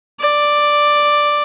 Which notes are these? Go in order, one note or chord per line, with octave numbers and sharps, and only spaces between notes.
D5